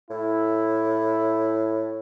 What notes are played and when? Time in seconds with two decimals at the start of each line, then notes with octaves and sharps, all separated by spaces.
0.10 A2 E4